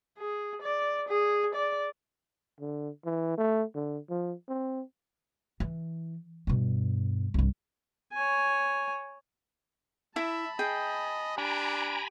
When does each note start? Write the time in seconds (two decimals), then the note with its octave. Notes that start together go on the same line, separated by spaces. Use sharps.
0.18 G#4
0.62 D5
1.08 G#4
1.54 D5
2.60 D3
3.05 E3
3.38 A3
3.75 D3
4.10 F3
4.49 C4
5.60 E3
6.47 G2 B2
7.34 C2 G2
8.13 C#5 G#5
10.16 E4 E5 A5 B5
10.59 G#4 D#5 G5
11.38 D4 G4 G#5 A#5 B5 D7